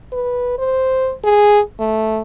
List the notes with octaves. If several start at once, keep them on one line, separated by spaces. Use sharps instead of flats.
B4
C5
G#4
A3